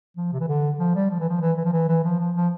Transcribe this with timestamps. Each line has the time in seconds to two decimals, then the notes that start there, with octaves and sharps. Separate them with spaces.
0.17 F3
0.33 C3
0.40 E3
0.48 D3
0.79 F3
0.95 G3
1.10 F3
1.20 E3
1.29 F3
1.41 E3
1.57 E3
1.65 F3
1.73 E3
1.88 E3
2.04 F3
2.19 F3
2.36 F3